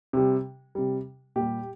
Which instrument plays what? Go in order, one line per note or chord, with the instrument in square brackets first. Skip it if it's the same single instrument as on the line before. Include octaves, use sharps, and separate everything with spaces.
[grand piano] C3 G3
C3 G3
A#2 G3 G4